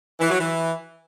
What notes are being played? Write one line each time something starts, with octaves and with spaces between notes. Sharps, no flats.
E3
F#3
E3